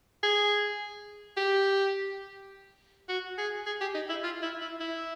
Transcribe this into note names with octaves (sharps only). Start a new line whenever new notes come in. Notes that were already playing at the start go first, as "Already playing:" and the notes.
G#4
G4
F#4
G#4
G#4
G4
D#4
E4
F4
E4
E4
E4